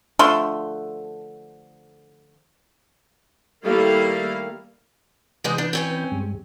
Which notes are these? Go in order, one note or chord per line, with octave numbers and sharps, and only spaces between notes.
D3 F3 A3 C6
D#3 G3 A3 A#3 E4 F5
C3 E3 G#3 B4 D#5 G6
D4
C4 C#4 G#5
G2 G3 G#3